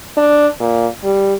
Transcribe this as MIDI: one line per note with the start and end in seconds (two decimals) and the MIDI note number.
0.17 0.48 62
0.60 0.87 46
1.04 1.34 55